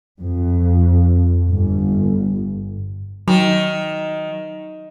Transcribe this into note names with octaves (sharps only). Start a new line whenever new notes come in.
F2
G1
D#3 F#3